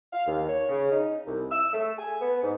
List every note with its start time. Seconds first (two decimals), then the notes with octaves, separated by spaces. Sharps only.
0.11 F5
0.26 D#2
0.48 C#5
0.68 C#3
0.90 D#4
1.25 C2
1.51 E6
1.73 A3
1.97 G#5
2.20 B3
2.42 G#2